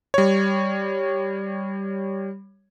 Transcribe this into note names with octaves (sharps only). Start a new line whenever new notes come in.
G3 C#5